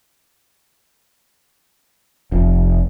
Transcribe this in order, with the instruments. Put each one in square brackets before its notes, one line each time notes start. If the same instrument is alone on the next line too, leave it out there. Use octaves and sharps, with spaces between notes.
[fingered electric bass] F1